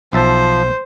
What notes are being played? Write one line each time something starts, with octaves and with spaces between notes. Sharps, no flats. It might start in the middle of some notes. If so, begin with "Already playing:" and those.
B1 F3 C5 E5 A5